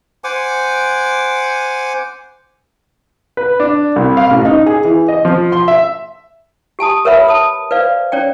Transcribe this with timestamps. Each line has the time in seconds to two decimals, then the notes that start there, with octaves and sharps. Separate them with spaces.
0.24 C5 F#5 G#5 D6
3.37 B4
3.60 D4
3.96 C2
4.17 F5
4.31 A1
4.45 D#4
4.66 G#4
4.85 E3
5.08 D#5
5.25 F3
5.52 C6
5.68 E5
6.79 G4 G#5 A5 D#6
7.05 A#4 B4 C#5 E5 F#5 B5
7.28 A5 D#6
7.71 B4 C5 D5 F5
8.12 C#4 C#5 D5 G5